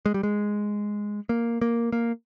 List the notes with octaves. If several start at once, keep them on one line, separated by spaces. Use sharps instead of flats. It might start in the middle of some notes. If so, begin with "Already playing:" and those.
G#3
G3
G#3
A#3
A#3
A#3